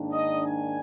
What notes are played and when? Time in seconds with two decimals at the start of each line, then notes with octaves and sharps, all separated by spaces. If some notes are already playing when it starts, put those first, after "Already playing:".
Already playing: G#2 D#3 A#3 D4
0.11 D#5
0.44 G#5